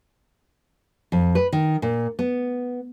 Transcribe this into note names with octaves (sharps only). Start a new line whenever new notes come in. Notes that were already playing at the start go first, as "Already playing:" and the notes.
F2
B4
D#3
A#2
B3